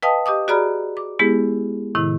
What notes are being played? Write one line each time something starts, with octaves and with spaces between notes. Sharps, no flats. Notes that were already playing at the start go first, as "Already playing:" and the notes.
B4 D#5 F5 G5 A5 D#6
G4 D#5 D6 D#6
F#4 G#4 D5 A#5 B5 F6
D6
G#3 B3 E4 G4 G#4
A2 C3 D#3 E4